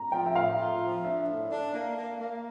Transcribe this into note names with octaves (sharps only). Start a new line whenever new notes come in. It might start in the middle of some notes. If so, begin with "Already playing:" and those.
Already playing: A#5
F3 G5
E5
A2 F5
F4
F3
D4 E5
A2
D4
A#3
A#3
A#3